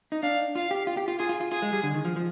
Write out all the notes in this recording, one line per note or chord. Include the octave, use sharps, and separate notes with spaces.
D#4
D4 F5
F4 F5
G4
F4
G4
F4
F4 G#4
F4
F4
F4 G#4
G#3
G3
D3
D#3
F3
F3